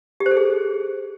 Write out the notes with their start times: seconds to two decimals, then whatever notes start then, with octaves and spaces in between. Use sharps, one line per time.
0.20 G4
0.26 C5
0.31 A4
0.37 G#4